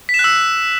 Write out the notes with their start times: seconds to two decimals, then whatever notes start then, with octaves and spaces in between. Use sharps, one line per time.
0.09 B6
0.14 E7
0.19 F#6
0.24 E6